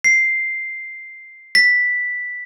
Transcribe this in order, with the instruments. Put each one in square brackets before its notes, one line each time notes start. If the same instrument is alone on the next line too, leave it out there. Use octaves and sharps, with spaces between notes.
[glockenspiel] C7
B6